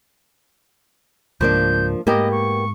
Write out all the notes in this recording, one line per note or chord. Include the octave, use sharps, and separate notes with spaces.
C#2 G#2 F3 A#3 D4 G6
G#2 A#3 B3 G4 D#5
C#6